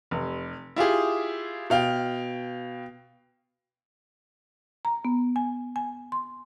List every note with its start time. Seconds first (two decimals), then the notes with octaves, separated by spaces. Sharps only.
0.11 F1
0.76 E4 F4 G4 G#4
1.70 B2 F5 G5
4.85 A#5
5.05 B3
5.36 G#5
5.76 G#5
6.12 C6